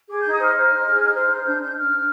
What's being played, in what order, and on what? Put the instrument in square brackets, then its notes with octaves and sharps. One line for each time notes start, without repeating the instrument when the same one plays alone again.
[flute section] G#4 D6
D#4 G6
D#6
C5 F6
C5
D#4
G#4
D#4
C5
D#4
D4 G6
D4 G6
D4 F6
D4